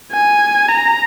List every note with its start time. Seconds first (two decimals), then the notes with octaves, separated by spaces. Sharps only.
0.12 G#5
0.69 A#5